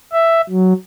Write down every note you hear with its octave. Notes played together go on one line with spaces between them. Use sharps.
E5
F#3